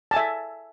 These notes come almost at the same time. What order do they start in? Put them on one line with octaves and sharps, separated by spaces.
A5 G#5 E5